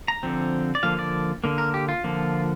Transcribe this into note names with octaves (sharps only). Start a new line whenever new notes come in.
A#5
D3 F3 C4
D5
D3 F3 A#3 F5
D5
D3 A#3
A#4
G4
F4
D3 F3 A#3